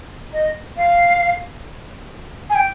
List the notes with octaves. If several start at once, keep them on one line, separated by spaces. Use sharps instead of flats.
D#5
F5
G#5
G5